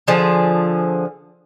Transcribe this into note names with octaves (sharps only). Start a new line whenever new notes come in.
D3 F3 G#4